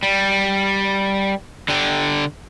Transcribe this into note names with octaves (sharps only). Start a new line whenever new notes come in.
G3
D3 G4